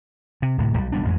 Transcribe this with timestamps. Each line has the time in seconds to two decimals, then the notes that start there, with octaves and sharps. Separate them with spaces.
0.42 C3
0.58 D1 A2 C3
0.77 B1 G3
0.92 D#1 G3 B3 D4
1.05 A1 F2 E3 G#3